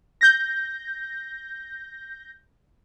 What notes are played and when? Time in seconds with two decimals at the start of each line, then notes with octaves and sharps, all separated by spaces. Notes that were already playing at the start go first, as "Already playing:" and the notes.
0.21 G6 A#6